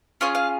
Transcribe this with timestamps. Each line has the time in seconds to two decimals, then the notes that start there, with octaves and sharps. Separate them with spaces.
0.21 C#4 F4 G#4 C#5
0.35 F5